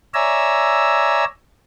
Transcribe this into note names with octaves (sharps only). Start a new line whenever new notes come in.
C#5 D5 E5 G#5 A#5 E6